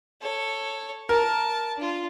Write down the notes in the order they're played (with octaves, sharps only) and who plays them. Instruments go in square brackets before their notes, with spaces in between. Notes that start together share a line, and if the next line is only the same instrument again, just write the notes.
[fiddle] A4 C#5
[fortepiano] A#4 [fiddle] A5
[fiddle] D4 F4